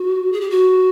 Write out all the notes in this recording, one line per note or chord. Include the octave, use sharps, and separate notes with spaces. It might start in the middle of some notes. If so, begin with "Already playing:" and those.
Already playing: F#4
G#4
G4
F#4